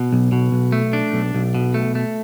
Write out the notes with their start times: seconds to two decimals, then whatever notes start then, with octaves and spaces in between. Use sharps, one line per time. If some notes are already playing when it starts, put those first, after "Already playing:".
Already playing: B2
0.13 B1
0.32 B2
0.52 B1
0.72 A3
0.93 D4
1.13 B1
1.34 B1
1.54 B2
1.74 A3
1.95 A3